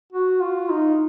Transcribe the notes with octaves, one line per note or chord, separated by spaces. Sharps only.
F#4
F4
D#4